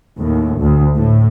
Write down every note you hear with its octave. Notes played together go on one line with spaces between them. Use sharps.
D#2 A2
D2
A2